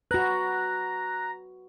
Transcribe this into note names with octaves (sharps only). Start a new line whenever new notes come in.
F#4 B4 A#5 F#6